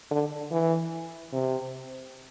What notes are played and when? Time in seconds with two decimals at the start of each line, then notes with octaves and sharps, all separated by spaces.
0.11 D3
0.52 E3
1.33 C3